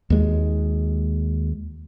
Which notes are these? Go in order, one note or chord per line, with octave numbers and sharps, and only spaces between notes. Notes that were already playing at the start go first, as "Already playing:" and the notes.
D#2 G#3